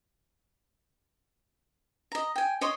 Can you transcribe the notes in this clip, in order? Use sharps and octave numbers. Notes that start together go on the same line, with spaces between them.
D#5 A#5
G5 G#5
C#5 D#5 C6 D#6